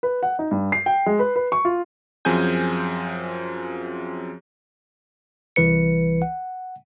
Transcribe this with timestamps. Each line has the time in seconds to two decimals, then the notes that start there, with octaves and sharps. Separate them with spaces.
0.03 B4
0.23 F#5
0.39 D#4
0.51 G2
0.72 C7
0.86 G5
1.06 G#3
1.19 B4
1.36 B4
1.52 C#6
1.65 F4
2.25 F#2 F3 C4 G#4 G#5 G6
5.56 C2 E3 B4 C#7
6.22 F#5